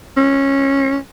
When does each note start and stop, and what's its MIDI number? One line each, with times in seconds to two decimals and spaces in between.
0.17 0.97 61